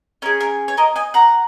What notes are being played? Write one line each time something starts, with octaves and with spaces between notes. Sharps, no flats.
C#4 G#4 A#4
A#4
C#5
A#4 D#5
D#5 G#5
F#5 A#5